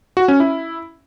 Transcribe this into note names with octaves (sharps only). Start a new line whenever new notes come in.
F#4
C#4
E4